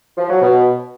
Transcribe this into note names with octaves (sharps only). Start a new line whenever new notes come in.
F3
F#3
B2